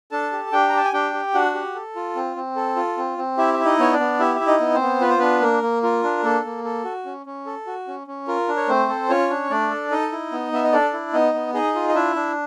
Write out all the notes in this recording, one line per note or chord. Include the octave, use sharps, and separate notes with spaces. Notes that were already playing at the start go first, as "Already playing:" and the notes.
D4 A4 A5
G4
D4 G4 G5
A#5
G4 A5
G#5
D4 G4 G5
G4
D4 F#4 F#5
G4
A4
F4
C4
C4
A4
F4
C4
C4
E4 G4 E5
E4 E5
D#4 D#5
B3 C#5
D4 D5
B3
E4 G4 E5
E4 E5
D#4 D#5
B3
C4 C5
B3
F4 B4
C5
B3 D4 B4
A#3 A#4
A#3
F4 A#4
D4
A#3 A4
A#3
A4
F#4
C#4
C#4
A4
F#4
C#4
C#4
F4 A#4
D4
C#5
A3 C4 C5
A4
C#4 F4 C#5
D4
A3 D4 D5
A4
D#4 A4 D#5
E4
B3
B3 E5
D#5
D4 A4 D5
E4
B3 D#4 D#5
B3
D#4 G#4 D#5
F4
D#5
D4 E4 E5
D4